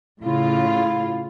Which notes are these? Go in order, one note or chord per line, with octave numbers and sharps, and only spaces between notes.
A2 C#3 E4 F4